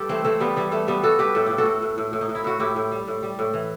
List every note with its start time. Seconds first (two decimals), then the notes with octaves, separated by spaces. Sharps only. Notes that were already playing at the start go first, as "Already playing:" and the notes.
Already playing: G2 G4 A4
0.09 E3 A3 C4
0.24 E3 A3 C4
0.40 G2 G3 B3
0.56 E3 G3
0.71 G3 A3
0.87 G2 G3 B3
1.03 G3 F#4 A4
1.19 G2 G4 B4
1.35 A2 A4
1.46 A2 G4
1.58 F#4 A4
1.65 A2
1.82 A2
1.98 A2
2.13 A2
2.21 D#4
2.29 A2
2.35 E4
2.44 A2 F#4
2.59 A2 E4 G4
2.76 A2
2.92 G3
3.07 A2
3.23 G3
3.39 A2
3.54 E3